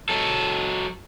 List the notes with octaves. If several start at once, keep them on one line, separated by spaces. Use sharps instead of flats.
F#3 A4